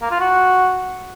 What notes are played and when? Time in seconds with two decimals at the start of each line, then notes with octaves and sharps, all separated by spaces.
0.02 A#3
0.11 F4
0.20 F#4